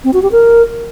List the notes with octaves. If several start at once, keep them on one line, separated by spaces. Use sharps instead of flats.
C4
F#4
G4
A#4